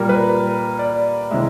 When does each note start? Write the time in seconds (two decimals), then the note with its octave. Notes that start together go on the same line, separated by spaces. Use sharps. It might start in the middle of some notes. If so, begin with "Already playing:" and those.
Already playing: A#2 G3 A#4
0.09 B4
0.79 D5
1.31 C3 E3 G#3 E5